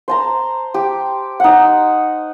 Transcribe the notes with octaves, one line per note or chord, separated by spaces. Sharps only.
C5 A5 A#5
G4
D#4 F#5